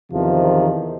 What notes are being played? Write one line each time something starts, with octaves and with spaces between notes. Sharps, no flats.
E2 C3 D#3 F3